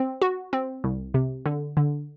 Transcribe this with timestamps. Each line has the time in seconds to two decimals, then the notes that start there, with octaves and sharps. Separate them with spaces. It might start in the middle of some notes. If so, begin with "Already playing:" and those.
Already playing: C4
0.22 F#4
0.53 C4
0.84 C2
1.14 C3
1.46 D3
1.77 D3